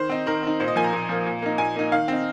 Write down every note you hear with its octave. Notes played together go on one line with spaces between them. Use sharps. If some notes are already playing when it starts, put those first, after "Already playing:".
Already playing: D#3 C5
C4 D#4
D#3 A#4
C4 D#4
A#2 C5
D#5
F3 A#3 G#5
A#5
A#2
F3 A#3
A#2
A#3 D#4
A#2 G#5
A#3 D#4
D#3 F5
C4 D#4